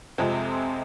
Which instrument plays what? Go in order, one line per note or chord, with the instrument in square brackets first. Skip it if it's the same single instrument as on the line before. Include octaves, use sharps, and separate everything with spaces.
[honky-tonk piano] F2 C3 F3 G#3 C4